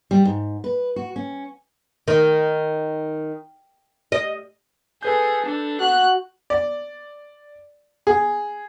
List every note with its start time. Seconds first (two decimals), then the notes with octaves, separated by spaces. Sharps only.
0.11 G3
0.25 G#2
0.64 B4
0.96 F#4
1.16 C#4
2.08 D#3
4.12 D#5
5.03 G#4 A4 B4 G6
5.46 D4
5.80 F#4 F#6
6.50 D5
8.07 G#4